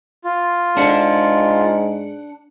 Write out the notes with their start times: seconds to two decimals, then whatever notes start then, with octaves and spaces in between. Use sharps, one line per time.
0.24 F4
0.77 G#2 D4 F#5